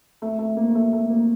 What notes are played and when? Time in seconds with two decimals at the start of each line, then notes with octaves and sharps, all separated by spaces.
0.22 A3
0.39 A3
0.57 A#3
0.69 A#3
0.75 A3
0.93 A3
1.10 A#3